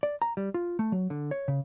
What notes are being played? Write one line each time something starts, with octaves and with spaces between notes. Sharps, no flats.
D5
A#5
G3
F4
A3
F#3
D3
C#5
C#3